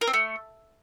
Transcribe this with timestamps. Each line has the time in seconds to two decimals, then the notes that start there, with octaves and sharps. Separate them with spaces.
0.01 A#4
0.07 C4
0.13 A3